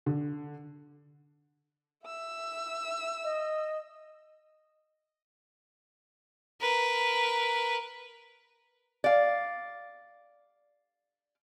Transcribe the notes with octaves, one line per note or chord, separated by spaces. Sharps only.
D3
E5 E6
D#5
A#4 B4
D5 F5